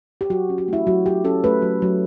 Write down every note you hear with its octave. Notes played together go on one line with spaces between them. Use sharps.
G4
F#3 F#4
C#4
F#4
A3 E4
F#3 F#4
F#3 G4
C#4 A4
A3 B4
F#3
F#3